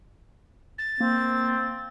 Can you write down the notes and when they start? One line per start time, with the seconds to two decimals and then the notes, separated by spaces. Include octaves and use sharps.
0.78 A6
1.00 A#3 C4